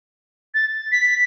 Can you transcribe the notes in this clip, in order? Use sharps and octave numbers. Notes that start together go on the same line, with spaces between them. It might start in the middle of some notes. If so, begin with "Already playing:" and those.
A6
B6